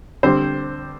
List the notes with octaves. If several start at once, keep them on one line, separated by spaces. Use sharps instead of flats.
D3 G3 C4 C5